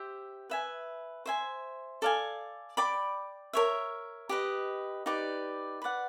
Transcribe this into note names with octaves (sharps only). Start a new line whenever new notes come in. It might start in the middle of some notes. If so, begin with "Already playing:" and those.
Already playing: G4 C5 E5
B4 E5 G#5
C5 E5 G#5
A4 D5 F5 G#5
D5 G5 B5 D6
A#4 C#5 E5
G4 B4 D#5
D#4 G4 B4 D5
B4 D5 F#5